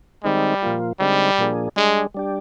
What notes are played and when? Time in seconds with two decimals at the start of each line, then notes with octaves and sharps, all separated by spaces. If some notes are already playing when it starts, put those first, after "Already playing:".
0.24 D#3 G3 G#3 C4 D#4
0.62 A#2 F3 A#3 F4
1.00 D3 G3 G#3 C4 D#4
1.38 A#2 F3 A#3 D4 G#4
1.76 G3 G#3 D4 G#4
2.14 G3 D4 G4